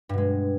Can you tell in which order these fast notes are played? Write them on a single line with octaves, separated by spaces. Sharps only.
G2 B2 G#3